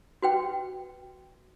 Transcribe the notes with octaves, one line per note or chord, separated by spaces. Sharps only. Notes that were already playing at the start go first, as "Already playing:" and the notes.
F#4 B4 G5